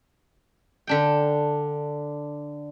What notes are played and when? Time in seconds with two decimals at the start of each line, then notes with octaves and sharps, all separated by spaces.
0.87 D3 D4 G5